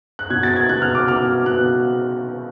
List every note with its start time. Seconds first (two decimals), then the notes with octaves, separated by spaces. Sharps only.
0.19 F#6
0.30 B2 G#6
0.43 A6
0.56 G#6
0.69 B2 F#6
0.82 F6
0.95 D6
1.08 B2 F6
1.46 B2 F#6